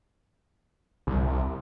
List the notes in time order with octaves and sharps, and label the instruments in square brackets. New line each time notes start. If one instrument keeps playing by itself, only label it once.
[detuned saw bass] C2